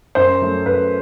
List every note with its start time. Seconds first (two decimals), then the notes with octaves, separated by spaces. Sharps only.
0.15 F#2 C5
0.42 F#3 A3
0.66 F#2 B4